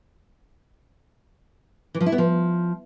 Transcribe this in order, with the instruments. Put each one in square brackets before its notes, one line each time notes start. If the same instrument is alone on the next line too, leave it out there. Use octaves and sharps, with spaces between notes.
[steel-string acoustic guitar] E3
F3
E4
B3
F3